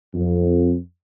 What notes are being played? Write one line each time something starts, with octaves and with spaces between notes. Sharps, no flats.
F2